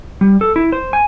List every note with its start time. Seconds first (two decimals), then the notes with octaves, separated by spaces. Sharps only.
0.21 G3
0.41 A4
0.56 E4
0.72 C5
0.93 G#5